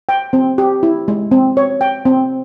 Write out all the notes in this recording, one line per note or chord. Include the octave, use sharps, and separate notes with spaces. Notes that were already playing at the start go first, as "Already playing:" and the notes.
G5
C4
G4
E4
G#3
C4
C#5
G5
C4